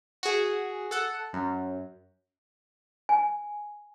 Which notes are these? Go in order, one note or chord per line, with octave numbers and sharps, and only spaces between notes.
F#4 G#4
A4 F#5
F#2
G#5